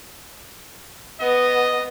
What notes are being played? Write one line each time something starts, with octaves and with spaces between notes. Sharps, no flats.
B3 D#5